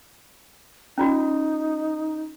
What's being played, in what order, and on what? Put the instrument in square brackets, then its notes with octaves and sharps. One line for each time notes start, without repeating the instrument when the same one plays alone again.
[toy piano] C#4 F4 F#4 [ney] D#4